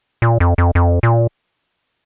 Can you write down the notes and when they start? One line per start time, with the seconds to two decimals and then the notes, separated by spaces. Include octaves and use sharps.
0.22 A#2
0.40 F2
0.58 F2
0.75 F2
1.03 A#2